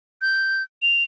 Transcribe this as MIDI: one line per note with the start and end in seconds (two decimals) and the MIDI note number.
0.22 0.63 91
0.82 1.04 101